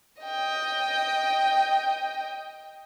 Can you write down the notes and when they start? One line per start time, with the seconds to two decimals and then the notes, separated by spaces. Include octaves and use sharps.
0.23 D#5 G5